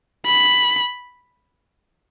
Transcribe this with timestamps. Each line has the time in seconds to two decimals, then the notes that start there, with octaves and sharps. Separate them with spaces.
0.26 B5